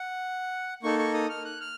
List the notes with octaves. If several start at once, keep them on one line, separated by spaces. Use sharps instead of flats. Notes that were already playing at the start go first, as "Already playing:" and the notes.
Already playing: F#5
A#3 D#4 A4 C#6
C#6
D#6
F6
F#6
F6